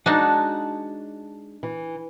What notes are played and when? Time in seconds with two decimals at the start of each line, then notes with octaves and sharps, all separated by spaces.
0.06 G#3 D4 D#4 F#4 F#5 A5
1.63 E3